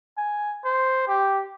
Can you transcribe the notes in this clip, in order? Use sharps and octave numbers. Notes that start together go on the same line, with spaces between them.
G#5
C5
G4